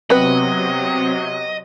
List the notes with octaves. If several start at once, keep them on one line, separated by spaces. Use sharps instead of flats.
C3 F#3 B3 C4 B4 D#5